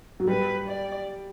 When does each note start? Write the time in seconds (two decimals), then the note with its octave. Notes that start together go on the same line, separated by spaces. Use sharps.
0.20 F#3
0.27 G3 B4
0.68 D5